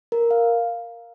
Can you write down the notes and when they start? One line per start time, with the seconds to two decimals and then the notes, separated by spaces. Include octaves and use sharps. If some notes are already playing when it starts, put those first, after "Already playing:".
0.12 A#4
0.31 F5